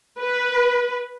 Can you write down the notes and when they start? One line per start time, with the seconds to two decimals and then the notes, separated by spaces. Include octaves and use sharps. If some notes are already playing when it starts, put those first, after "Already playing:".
0.20 B4